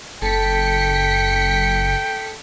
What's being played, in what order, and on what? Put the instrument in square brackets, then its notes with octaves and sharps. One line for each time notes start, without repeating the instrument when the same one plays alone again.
[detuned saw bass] F#1 [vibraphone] A4 A5 [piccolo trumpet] G5 [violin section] B6 C#7